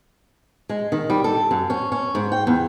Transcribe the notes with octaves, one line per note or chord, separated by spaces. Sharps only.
G#3
D#3
G3
A4
F#2
C#4
C#4
G#2
G5
E2